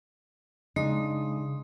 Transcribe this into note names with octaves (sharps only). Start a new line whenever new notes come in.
C#3 G#3 D4 D#4 C6 D#6